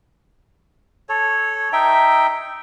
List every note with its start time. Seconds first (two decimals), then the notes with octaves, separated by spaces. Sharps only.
1.09 A4 C#5
1.73 D#4 E5 G5